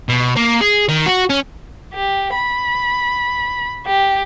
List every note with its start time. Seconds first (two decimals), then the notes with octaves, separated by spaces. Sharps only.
0.09 B2
0.36 A#3
0.61 G#4
0.88 D#3
1.06 F#4
1.30 C#4
1.94 G4
2.35 B5
3.85 G4